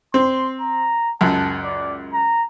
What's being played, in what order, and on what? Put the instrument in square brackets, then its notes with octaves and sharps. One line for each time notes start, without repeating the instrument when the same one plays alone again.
[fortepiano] C4 [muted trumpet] C6
[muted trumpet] A#5
[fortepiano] C#2 F#2 [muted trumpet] A5
[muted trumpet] D5
A#5